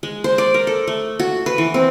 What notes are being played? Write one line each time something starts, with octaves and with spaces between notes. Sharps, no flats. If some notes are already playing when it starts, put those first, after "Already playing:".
G#3
C5
D5
A#4
A4
A3
F#4
B4
E3
C4